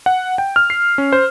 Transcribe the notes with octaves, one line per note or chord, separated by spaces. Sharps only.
F#5
G5
F6
C7
C#4
C5